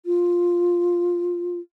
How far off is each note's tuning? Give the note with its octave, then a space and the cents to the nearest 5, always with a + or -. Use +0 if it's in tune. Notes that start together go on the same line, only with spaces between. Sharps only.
F4 +5